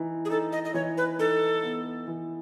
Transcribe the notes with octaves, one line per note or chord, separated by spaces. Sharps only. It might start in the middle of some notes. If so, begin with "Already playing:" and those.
Already playing: E3 D#4
G#4
D#4 A4
D#5
D#5
E3 C#5
B4
D#4 A4
B3
E3